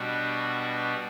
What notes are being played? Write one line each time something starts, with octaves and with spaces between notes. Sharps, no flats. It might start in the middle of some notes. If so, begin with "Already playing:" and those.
Already playing: B2 G3 D4 F#4